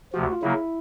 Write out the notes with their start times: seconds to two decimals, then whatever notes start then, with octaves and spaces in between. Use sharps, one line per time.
0.13 D2 C3 F3 F#4
0.23 F#4
0.33 F4
0.43 C#3 F#3 A#3 E4